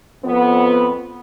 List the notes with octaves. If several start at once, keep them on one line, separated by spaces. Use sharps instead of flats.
F2 B3